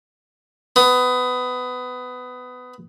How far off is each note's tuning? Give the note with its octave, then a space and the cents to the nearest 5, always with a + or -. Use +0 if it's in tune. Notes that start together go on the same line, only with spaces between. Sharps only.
B3 +20